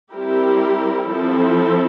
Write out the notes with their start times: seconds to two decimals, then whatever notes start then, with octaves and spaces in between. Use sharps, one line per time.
0.12 G3 C4 E4 G4 A#4
1.10 F3 C4 E4 A4